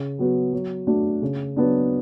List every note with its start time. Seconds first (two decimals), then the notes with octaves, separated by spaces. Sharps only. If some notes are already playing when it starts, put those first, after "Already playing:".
Already playing: C#3
0.19 F#3 B3 F#4
0.53 F#3
0.87 A3 D4 F#4
1.22 C#3
1.56 F#3 B3 D4